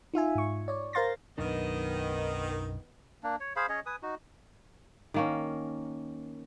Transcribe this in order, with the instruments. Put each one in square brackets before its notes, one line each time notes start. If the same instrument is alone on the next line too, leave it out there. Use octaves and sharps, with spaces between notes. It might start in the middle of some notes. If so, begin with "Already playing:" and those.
[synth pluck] D#4 F4 E5 G#5
G#2 C#6
C#5 D5
A#4 C5 F5 C6 A6 A#6
[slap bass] B1 F#2 D4 [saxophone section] D#3 [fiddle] B3 D#5
[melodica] A#3 D4
C#5
G#4 C5 F5 B5
C#4 G#4 C#5 D#5
B4 G#5 D#6
D#4 F#4
[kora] D#3 A#3 C#4